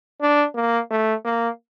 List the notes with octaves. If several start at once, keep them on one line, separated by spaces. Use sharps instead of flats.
D4
A#3
A3
A#3